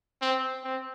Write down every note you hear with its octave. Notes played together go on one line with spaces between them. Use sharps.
C4
C4